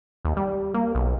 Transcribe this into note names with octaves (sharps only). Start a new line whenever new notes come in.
D#2
G3
A#3
B1